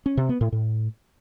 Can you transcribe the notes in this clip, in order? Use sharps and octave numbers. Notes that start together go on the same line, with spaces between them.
C#4
C3
B3
A2
A2